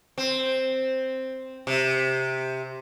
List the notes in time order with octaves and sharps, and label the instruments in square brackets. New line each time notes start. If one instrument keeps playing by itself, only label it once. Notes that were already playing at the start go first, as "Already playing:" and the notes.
[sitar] C4
C3